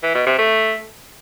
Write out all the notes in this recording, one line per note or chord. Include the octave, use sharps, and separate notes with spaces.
E3
B2
C3
A3